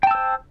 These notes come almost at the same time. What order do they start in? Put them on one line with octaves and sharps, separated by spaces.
G5 A5 E6 C5